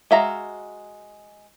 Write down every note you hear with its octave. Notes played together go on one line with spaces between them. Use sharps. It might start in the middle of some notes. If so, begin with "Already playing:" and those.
G#3 F#4 E5 F5 A#5